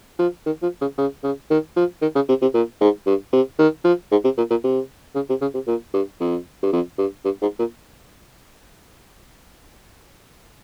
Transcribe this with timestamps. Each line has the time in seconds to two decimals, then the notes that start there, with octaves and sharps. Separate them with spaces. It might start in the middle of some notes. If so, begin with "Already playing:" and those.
0.19 F3
0.46 D#3
0.62 F3
0.81 C#3
0.98 C#3
1.23 C#3
1.50 D#3
1.76 F3
2.02 D#3
2.15 C#3
2.29 C3
2.42 C3
2.54 A#2
2.81 G#2
3.06 G2
3.33 C3
3.59 D#3
3.84 F3
4.11 G#2
4.24 C3
4.38 A#2
4.50 A#2
4.64 C3
5.15 C#3
5.29 C3
5.41 C#3
5.54 C3
5.67 A#2
5.94 G2
6.20 F2
6.63 G2
6.72 F2
6.98 G2
7.25 G2
7.42 G#2
7.59 A#2